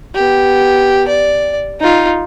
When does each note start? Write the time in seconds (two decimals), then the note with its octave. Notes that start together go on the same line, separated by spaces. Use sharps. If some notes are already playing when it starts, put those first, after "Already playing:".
0.15 B3 G4
1.08 D5
1.80 D#4 F4